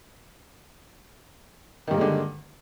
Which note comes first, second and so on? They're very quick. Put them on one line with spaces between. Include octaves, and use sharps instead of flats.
D#3 G2 A#3 G#3 D3